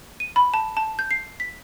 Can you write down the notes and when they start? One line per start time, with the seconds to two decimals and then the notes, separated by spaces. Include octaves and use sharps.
0.20 D#7
0.36 B5
0.54 A5
0.77 A5
0.99 G6
1.11 C7
1.40 B6